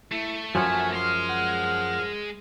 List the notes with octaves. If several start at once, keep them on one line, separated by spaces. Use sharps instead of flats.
A3 E4
F#2 F3 F#4 G#5
G#3 C6 F6
F#5